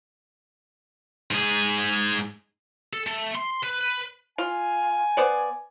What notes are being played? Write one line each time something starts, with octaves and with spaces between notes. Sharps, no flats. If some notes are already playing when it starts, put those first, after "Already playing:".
G#2 G#4
A4
A3
C6
B4
F4 G#5
B3 C5 D5